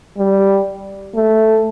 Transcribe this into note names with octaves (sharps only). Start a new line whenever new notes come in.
G3
A3